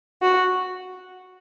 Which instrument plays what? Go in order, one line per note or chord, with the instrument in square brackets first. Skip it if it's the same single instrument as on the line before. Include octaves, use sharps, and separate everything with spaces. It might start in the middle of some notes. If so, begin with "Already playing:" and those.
[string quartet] F#4